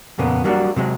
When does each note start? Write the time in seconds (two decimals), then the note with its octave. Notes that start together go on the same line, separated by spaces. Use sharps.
0.18 F2 A#2 C#3 A#3 B3
0.44 F#3 G3 A#3 D4 F#4
0.76 C3 F#3 G#3